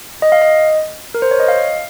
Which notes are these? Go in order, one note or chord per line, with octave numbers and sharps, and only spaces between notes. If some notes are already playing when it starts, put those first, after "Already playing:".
D#5
F5
D#5
A#4
C5
C#5
D#5
F5